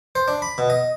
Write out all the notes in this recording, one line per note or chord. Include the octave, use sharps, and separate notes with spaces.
C5
D4
B5
B2
D#5